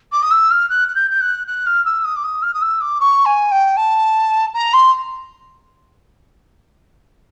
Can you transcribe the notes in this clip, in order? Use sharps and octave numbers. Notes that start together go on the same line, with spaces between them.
D6
D#6
E6
F6
F#6
F#6
G6
G6
F#6
F#6
F6
E6
D#6
D6
D#6
F6
D#6
E6
D6
C#6
G#5
G5
A5
A#5
C6